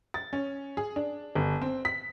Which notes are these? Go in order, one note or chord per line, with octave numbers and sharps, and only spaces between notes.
A6
C#4
G#4
D4
G1
C4
B6